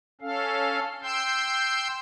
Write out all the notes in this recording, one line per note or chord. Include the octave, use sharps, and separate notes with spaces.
C#4 A4 F5
G5 C6 E6 G6